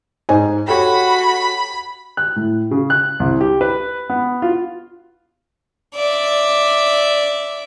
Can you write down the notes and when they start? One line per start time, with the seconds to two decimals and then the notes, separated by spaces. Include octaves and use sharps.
0.29 G#2 C5 D#5 G#5
0.68 F#4 G4 A4 C#5 B5
2.17 F#6
2.36 A2
2.71 C#3
2.90 F#6
3.20 C2
3.41 G4
3.61 B4
4.10 B3
4.42 F4
5.95 D5 E5